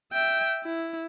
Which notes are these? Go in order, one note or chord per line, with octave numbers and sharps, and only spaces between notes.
E5 G5
E4